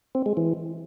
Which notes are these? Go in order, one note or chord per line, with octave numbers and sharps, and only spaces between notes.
C4
G#3
E3